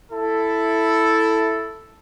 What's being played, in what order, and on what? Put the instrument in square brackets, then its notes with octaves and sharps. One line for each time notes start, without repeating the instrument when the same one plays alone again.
[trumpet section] E4 A4